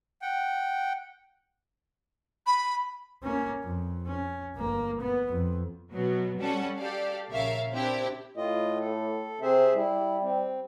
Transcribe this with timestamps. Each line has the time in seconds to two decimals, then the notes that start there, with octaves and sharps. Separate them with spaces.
0.22 F#5 G5
2.47 B5
3.23 A#3 C#4
3.63 F2
4.07 C#4
4.56 G1 A#3
5.01 B3
5.29 F2
5.92 B2 F#3 B3
6.38 G3 C#4 A4 F#5
6.78 G4 A4 D5 F5
7.31 A#1 C#3 A#4 C#5 E5 F5
7.73 C4 D4 E4 G4
8.37 A2 F4 D#5
8.80 A4
9.42 C3 G#4 C5 E5
9.75 G3 E4
10.21 C4